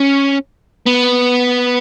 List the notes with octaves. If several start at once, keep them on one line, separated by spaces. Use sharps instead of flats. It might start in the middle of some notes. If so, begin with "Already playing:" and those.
Already playing: C#4
B3